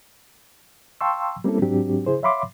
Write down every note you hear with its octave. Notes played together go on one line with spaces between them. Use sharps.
F5 G5 A5 C6 C#6 E6
G3 A#3 C4 C#4 E4 A4
G#2 F#3 C4 D4 F#4 G4
C#3 E4 G#4 C5
C#5 E5 F5 B5 C6 D6